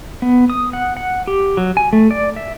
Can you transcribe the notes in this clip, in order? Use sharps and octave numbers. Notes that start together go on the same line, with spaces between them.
B3
D#6
F#5
F#5
G4
F#3
G#5
A3
D5
E5